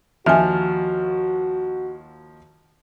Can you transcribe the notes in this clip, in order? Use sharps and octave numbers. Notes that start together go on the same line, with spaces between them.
D#2 F3 F#4 E5 G#5 F6